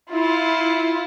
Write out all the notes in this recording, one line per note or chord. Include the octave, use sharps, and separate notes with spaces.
E4 F4